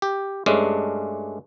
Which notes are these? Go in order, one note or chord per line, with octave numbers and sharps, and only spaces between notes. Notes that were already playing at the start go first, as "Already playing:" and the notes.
G4
G2 G#3 A3 C#4 D4